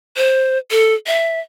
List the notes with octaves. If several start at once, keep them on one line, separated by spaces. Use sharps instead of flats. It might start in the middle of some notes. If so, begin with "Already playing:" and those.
C5
A4
E5